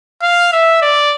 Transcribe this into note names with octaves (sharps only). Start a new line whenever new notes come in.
F5
E5
D5